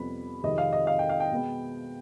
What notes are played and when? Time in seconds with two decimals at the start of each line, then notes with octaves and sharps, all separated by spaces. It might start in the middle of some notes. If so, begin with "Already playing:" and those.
Already playing: F2 C3 G3 B3 B5
0.43 F2 C3 D#3 G#3 D#5
0.58 F5
0.73 D#5
0.87 F5
0.99 G5
1.09 F5
1.20 G5
1.31 B2 G#3 B3